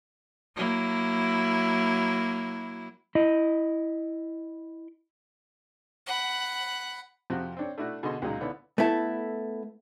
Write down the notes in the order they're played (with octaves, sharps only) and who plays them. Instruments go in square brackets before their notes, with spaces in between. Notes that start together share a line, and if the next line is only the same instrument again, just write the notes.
[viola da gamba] F#3 A#3 E4
[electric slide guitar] E4 D#5
[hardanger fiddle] F#5 B5
[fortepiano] F2 C3 F3 F#4
C4 D4 C#5
A3 D4 E4 F#4
B2 D3 B3 G#4 D#5 C6
C#2 A#2 F#3 G#3 D#4
D3 B3 C#4 D4 E4
[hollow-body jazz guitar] A3 B3 E4 A4